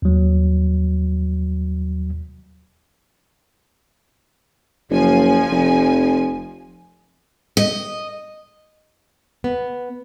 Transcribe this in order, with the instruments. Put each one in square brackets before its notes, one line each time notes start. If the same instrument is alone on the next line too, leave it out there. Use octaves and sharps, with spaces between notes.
[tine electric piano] D#2 F#3
[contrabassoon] F#1 [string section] F3 G#5
[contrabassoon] F1
[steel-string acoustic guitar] D#5
[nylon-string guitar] B3